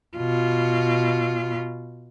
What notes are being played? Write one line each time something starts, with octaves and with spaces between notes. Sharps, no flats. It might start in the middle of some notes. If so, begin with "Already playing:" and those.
B2 F4